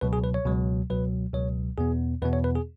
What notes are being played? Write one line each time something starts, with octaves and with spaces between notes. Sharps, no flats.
C#2 B2 F#3 B4
G#4
B4
C#5
C#2 B2 F#3
C#2 B2 F#3 B4
C#2 B2 F#3 C#5
E2 B2 B3 G#4
E2 B2 B3 B4
C#5
B4
G#4